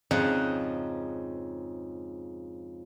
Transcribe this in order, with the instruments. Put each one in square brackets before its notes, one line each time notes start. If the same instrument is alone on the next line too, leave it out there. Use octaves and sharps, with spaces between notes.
[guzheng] F2 G#2 C#3 F3 D#4 F#5